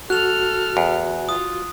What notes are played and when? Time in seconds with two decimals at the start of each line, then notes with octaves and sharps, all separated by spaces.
0.10 F#4 A4 F6 F#6 F7
0.77 E2
1.29 F4 D#6